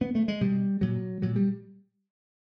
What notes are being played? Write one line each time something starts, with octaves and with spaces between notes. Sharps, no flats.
B2 B3
A3
G#3
B2 G3
A#2 F#3
A#2 F#3
G3